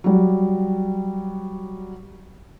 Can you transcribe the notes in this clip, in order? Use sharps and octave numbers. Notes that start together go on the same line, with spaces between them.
F#3 G3